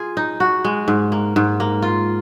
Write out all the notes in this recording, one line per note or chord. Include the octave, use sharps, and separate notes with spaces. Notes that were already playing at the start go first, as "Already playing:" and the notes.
Already playing: F4 G#4
D#4
F#4
G#3
G#2
A#3
G#2
A#3
F4